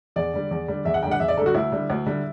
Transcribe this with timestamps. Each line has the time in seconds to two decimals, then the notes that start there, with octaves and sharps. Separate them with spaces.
0.16 E2 D5
0.33 D3 G3
0.51 E2
0.68 D3 G3
0.85 E2 E5
0.94 F#5
1.03 D3 G5
1.07 G3 F#5
1.20 E2 E5
1.28 D5
1.37 D3 G3 A4
1.46 F#4
1.54 D2 E4
1.72 D3 G3
1.90 D2
2.06 D3 G3